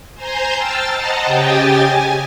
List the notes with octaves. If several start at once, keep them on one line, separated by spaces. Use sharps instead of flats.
C5 G#5 A#5 C6 G6
G5 A5 E6 F6 A6
C5 D#5 F#5 A5 A#5
C#3 G4 D#5 G5 G#5 A6
G#5